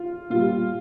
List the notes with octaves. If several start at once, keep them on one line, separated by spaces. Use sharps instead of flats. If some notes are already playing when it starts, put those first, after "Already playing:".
Already playing: F4
A#2 G3 F4